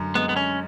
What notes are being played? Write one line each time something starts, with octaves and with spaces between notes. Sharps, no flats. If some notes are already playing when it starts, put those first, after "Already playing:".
Already playing: F#2 D3
G#3 B3
B3
C#4